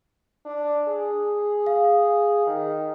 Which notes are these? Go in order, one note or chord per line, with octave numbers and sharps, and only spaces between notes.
D4
G#4
F5
D#3